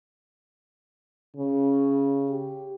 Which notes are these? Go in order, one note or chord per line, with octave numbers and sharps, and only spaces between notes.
C#3 C#4
G4